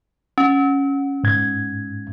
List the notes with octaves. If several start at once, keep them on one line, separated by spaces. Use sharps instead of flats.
C#4
G#2 G#6